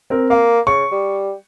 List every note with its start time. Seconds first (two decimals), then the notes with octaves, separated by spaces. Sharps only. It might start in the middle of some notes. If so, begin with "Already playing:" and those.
0.10 C4 A#4
0.30 A#3 F5
0.67 C#3 C#6
0.92 G3